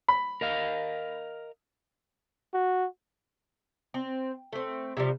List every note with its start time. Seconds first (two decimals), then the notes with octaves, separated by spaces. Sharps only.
0.08 B5
0.41 A#4 D#5 F5
2.54 F#4
3.94 C4
4.53 A3 C4
4.97 C3 F3 G3